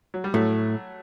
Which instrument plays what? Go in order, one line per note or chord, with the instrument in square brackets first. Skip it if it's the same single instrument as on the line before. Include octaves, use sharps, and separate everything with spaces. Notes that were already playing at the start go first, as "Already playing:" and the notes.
[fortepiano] F#3
G3
[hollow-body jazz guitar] A2 [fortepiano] F#3 A3